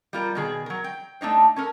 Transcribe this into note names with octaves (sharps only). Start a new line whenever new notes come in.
G3 F4 A#4
B2 D#3 G#4
F#3 A#4
G5
A3 D4 D#4 C5
C#4 A4 A#4